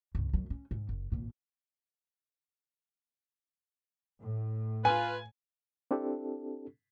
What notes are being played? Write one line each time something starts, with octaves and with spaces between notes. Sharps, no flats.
C#2 G2
F#2 F#3
C#4
G#2
F#1
G#1 A#2
A2
F4 B4 G#5
C4 D4 E4 G4 A4